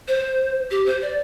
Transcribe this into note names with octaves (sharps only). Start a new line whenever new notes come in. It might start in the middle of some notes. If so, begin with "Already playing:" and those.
C5
G4
C5
D5